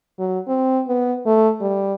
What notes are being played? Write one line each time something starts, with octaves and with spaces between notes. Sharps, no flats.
F#3
C4
B3
A3
G3